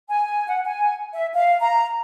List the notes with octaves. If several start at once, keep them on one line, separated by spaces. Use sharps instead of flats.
G#5
F#5
G#5
E5
F5
A#5